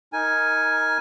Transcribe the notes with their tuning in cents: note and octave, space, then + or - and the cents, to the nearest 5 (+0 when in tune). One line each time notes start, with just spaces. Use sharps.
D#4 +20 A#4 +0 G#5 +0